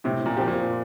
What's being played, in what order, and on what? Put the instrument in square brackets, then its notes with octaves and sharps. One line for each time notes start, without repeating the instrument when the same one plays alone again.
[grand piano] A2 [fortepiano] C3
[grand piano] A#2
[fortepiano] F3 C4 G4
[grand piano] A#2